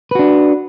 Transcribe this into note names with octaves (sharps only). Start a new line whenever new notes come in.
D4 F#4 B4